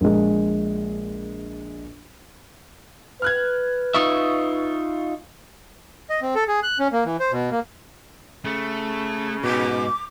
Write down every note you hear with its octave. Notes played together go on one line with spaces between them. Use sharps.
A#1 G#3
B4 F6 F#6 G#6
D#4 F4 E5 C#6 D#6
D#5
C4
A4
G#4
F#6
C#4
A#3
E3
C5
B2
A#3
C#3 A3
G#2 B2 D6